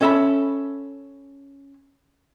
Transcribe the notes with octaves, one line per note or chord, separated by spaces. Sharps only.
C#4 A4 E5 A#5 B5